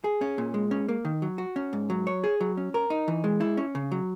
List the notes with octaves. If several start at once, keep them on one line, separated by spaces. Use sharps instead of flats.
G#4
C#4
A#2
G#3
C#4
A#3
D#3
F#3
F#4
C#4
G#2
F#3
C#5
G#4
F#3
C#4
A#4
D#4
E3
G#3
E4
C#4
C#3
F#3